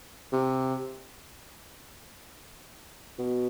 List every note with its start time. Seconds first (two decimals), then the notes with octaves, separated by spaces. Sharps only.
0.32 C3
3.19 B2